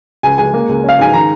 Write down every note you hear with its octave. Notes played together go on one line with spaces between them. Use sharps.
C#2 G#5
G#3 G#5
A#3
C#2
C#4 F5
G#2 G#5
D#3 A#5